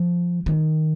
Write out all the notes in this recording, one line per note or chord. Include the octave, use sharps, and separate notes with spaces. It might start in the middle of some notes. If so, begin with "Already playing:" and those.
Already playing: F3
D#3